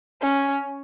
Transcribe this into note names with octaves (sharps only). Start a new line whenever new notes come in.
C#4